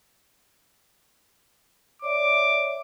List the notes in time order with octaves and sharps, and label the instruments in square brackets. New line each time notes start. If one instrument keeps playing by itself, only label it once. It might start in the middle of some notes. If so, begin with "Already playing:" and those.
[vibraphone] C#5 D5 E5 [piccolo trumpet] D6